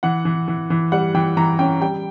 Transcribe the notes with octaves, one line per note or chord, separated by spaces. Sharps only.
E3 F#5
E3
E3
E3
G3 F#5
E3 G5
E3 A#5
C#4 G5
G3 G5